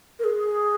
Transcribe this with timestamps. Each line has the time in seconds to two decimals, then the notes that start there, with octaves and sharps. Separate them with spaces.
0.19 A#4
0.24 G#4